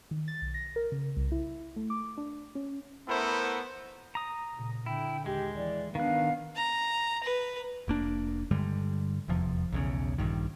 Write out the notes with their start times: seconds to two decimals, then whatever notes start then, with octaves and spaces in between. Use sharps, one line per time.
0.11 D#3
0.28 A6
0.42 B1
0.54 A#6
0.76 A#4
0.92 C#3
1.17 C2
1.32 E4
1.76 A3
1.90 D6
2.17 D4
2.55 C#4
3.08 A3 B3 E4 A#4 C5
4.15 A#5 D#6
4.54 A#2 C#3
4.86 D3 E4 G5
5.26 D#2 G#3 G4
5.56 E3 D5
5.95 D#3 B3 D4 F5 F#6
6.56 A#5
7.23 B4
7.88 F1 A#3 D4
8.51 G2 D3 G3 G#3
9.28 F1 E2 C3 F3
9.72 B1 E2 C#3
10.18 A#1 G2 D#3